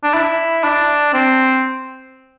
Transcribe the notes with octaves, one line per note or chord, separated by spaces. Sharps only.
D4
E4
D4
C4